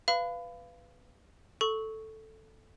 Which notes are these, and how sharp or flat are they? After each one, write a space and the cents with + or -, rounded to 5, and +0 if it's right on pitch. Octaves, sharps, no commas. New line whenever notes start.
B4 +10 F5 -15 B5 +25
A4 +0 C#6 +0